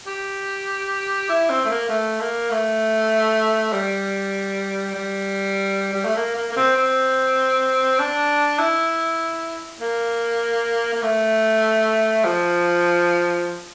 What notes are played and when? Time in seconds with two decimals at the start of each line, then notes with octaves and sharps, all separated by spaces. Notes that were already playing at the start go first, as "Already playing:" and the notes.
0.07 G4
1.29 E4
1.49 C4
1.65 A3
1.70 A#3
1.89 A3
2.21 A#3
2.51 A3
3.73 G3
4.95 G3
5.93 G3
6.05 A3
6.16 A#3
6.36 A#3
6.51 A#3
6.56 C4
6.77 C4
7.99 D4
8.59 E4
9.81 A#3
10.94 A#3
11.03 A3
12.25 F3